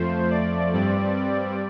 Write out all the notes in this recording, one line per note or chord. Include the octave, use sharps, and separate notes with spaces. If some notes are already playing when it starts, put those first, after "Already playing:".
Already playing: F2 F3 A3 C5
D5
G2 G3 C4 D5
D5